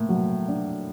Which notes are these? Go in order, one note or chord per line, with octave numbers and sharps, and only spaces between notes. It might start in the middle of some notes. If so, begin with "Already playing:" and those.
Already playing: A2 A#3
F#3
D4